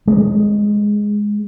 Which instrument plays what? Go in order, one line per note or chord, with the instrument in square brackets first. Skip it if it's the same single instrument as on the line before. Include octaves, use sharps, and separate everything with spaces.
[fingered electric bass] G#3